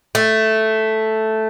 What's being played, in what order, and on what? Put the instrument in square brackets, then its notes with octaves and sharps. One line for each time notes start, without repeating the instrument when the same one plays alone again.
[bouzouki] A3